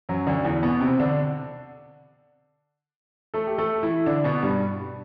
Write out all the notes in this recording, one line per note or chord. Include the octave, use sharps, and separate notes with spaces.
F#2 F#3
D2 D3
E2 E3
B2 B3
C3 C4
D3 D4
A3 A4
G4
A3 A4
E3 E4
D3 D4
B2 B3
G2 G3